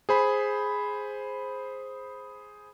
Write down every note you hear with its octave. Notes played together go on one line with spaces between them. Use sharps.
G#4 C5 B5